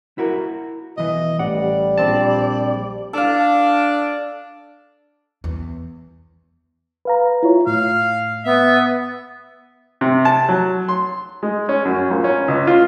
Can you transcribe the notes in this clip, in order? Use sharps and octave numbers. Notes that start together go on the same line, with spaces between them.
E4 F#4 A#4
B1 E3 D#5
A1 G3 D5 F#5
A#1 C4 A5
D4 A4 F5
E2
B4 F5 A#5
E4 F4 C#5
A2 F5
B3 E5
C3
A5
F#3
C6
G#3
C#4
F#2
A#1
C#4
C#2
F4